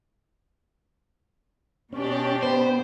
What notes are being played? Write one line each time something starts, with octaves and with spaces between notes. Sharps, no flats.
B2 C#4 D4 G4
B3 C5